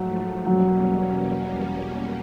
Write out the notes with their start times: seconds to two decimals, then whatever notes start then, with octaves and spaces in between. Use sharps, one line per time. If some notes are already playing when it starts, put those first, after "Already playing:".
Already playing: G#2 F3 F#3 A3
0.46 E2 B2 F#3 G3 A#3 C#4